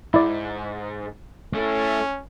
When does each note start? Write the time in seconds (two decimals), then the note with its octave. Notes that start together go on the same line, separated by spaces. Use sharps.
0.14 G#2 E4 D5
1.55 A3 C#4 E4